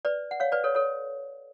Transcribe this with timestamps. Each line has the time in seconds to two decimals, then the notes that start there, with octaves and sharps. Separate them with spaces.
0.05 B4 D5
0.31 F#5
0.40 C#5 F5
0.52 B4 D5
0.64 A4 C#5
0.75 A4 C#5